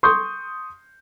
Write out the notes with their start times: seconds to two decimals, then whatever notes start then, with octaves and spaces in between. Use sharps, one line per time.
0.03 C6 C#6 D#6 G6